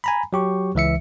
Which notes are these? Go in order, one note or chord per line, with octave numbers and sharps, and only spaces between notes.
G#5 A#5 B5
F#3 G4 C#6
C#2 E3 E5 C#7